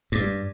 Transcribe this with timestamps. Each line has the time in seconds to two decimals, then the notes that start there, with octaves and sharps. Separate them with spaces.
0.12 G2